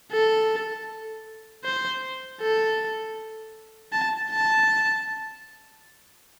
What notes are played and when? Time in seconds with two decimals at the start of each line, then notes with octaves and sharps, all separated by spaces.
0.11 A4
1.64 C5
2.41 A4
3.92 A5
4.31 A5